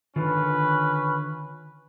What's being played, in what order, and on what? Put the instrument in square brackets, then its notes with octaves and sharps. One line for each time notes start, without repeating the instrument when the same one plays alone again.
[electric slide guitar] D3 D#3 F4 [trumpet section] C#4 B4